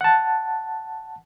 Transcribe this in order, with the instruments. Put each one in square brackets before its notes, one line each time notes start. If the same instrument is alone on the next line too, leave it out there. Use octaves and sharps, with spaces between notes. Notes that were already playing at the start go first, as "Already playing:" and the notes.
[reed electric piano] F#5 A5